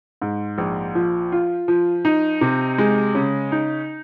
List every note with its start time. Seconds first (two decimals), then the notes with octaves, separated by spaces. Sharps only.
0.22 G#2
0.58 A#1
0.95 F3
1.32 F4
1.68 F3
2.05 D#4
2.41 C3
2.78 G#3
3.15 C#3
3.52 D#4